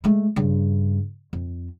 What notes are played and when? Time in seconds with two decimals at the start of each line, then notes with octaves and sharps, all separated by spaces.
0.04 G#3 A3
0.36 G2 C#3
1.33 F2